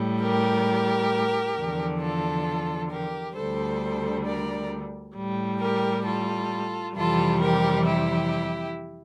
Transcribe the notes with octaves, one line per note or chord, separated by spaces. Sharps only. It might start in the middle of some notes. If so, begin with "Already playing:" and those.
Already playing: A2 G3
G4 A#4
E2 D3 F3
F4 A4
G4 A#4
D2 D3 G3 A4 C5
A#4 D5
A2 G3
G4 A#4
F4 A4
F2 C3 E3 G3 F4 A4
G4 A#4
E4 G4